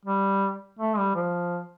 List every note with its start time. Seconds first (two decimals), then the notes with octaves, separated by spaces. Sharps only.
0.05 G3
0.79 A3
0.98 G3
1.15 F3